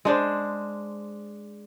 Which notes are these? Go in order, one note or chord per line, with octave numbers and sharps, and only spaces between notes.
G#3 D4 C5